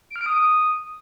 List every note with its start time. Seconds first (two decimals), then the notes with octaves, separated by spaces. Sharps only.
0.10 D7
0.16 F6
0.21 D7
0.26 D#6